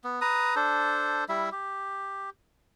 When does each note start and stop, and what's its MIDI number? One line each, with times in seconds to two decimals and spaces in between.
0.04 0.20 59
0.21 0.55 71
0.21 0.55 82
0.21 0.55 87
0.56 1.24 62
0.56 1.24 69
0.56 1.24 72
1.29 1.49 55
1.29 1.49 64
1.29 1.49 76
1.52 2.30 67